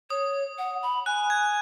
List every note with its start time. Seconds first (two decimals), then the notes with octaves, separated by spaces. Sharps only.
0.10 C#5 D#6
0.58 F#5
0.83 B5
1.06 G#5 F#6
1.30 G#6